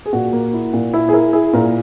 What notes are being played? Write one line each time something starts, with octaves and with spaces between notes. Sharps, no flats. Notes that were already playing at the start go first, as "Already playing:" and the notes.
G#4
A#2 F#4
A#3
E4
A#2
E4
G#4
E4 A#4
E4 G#4
A#2 A#4